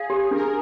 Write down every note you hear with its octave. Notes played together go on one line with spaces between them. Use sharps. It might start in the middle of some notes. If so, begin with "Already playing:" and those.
Already playing: G#4 F5
G4
D4 A#4